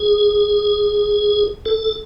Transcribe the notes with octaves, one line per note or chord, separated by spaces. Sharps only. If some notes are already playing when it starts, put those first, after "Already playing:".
Already playing: G#4
A4